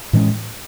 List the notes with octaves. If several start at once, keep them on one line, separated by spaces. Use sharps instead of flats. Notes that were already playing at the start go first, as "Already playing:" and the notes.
A2 E3 G#3 C#4